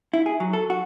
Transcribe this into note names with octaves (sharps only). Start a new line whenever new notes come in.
E4
G#4
F#3
A4
F#4